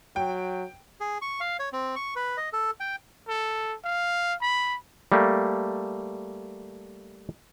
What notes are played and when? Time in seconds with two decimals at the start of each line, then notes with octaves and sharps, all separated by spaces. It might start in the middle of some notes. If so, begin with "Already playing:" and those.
0.16 F#3 G5
1.00 G#4
1.22 C#6
1.40 F5
1.59 C#5
1.73 C4
1.96 C#6
2.16 B4
2.37 D#5
2.53 A4
2.80 G5
3.28 A4
3.84 F5
4.41 B5
5.12 G3 A3 A#3